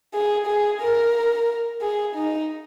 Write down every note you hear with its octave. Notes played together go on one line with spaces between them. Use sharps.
G#4
G#4
A#4
G#4
D#4